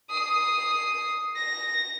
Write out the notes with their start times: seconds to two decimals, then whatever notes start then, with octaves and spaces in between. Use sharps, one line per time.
0.10 D#6 C7
1.36 A#6